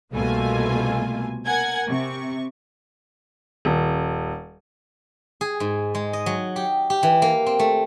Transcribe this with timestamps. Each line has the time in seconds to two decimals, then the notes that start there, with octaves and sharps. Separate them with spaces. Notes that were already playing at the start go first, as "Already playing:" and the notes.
0.12 C2 B2 A3 A#3 F4 G#5
1.44 A#4 F#5 G#5 G#6
1.87 C3 C#6
3.65 D#1
5.41 G#4
5.60 G#2
5.95 G#3
6.13 D#5
6.26 F#3
6.56 G4
6.90 G4
7.03 E3
7.22 A#3
7.46 C4
7.59 A3